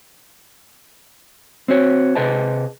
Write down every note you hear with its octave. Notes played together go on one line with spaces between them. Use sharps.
C4 F#4 C#5
C3 G#4 B4 D#5 A5